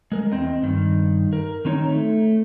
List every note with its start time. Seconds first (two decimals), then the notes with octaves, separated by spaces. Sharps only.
0.12 G#3 A#4
0.32 E2 C4 D#5
0.63 G2 D#3
1.33 A#4
1.65 D#3 C4 D#4 C#5
1.89 A3